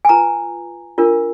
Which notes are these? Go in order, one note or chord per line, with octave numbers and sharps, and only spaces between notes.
G#5
F4 B4 A#5
D4 F4 A#4